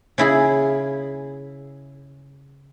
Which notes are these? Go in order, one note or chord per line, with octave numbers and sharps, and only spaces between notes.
C#3 E4 G#4